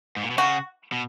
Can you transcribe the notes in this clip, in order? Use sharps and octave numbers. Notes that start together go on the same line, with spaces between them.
G#2
A#2
B2
C#3 F#4
B2